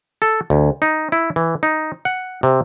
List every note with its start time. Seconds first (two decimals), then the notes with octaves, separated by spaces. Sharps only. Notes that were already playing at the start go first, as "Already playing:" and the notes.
0.22 A4
0.50 D2
0.82 D#4
1.12 E4
1.36 E3
1.63 D#4
2.05 F#5
2.43 C3